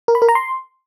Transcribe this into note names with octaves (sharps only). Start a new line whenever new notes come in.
A#4
B5
A#4
A#5
C6